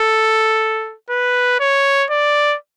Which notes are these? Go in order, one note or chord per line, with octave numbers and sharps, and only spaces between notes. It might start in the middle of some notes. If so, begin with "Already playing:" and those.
Already playing: A4
B4
C#5
D5